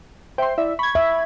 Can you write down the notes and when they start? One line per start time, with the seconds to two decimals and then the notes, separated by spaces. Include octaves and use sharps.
0.38 C5 E5 G5 C6
0.58 E4 D5 E5
0.79 B5 C#6 G#6
0.95 E5